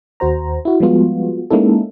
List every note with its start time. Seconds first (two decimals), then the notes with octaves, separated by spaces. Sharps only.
0.20 D#2 F#4 C5 A#5
0.65 E4 F#4
0.80 F3 G3 G#3 B3 F4 F#4
1.50 G#3 A#3 C#4 D#4 E4 A4